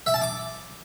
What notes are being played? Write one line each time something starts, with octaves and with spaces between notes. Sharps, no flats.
E5
A5
D6